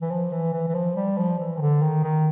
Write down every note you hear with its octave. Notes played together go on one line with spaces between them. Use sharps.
E3
F3
E3
E3
E3
F3
G3
F3
E3
D#3
D3
D#3
D#3